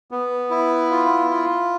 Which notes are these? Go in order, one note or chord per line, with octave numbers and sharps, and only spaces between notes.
B3
E4
F4
F4